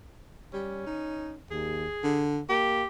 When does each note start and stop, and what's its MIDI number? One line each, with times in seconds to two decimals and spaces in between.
0.53 0.84 55
0.53 1.37 61
0.87 1.34 63
1.51 1.86 39
1.51 2.22 68
2.03 2.40 50
2.49 2.83 58
2.49 2.87 67